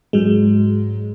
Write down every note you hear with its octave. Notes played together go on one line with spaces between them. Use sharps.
G#2 F#3 G#3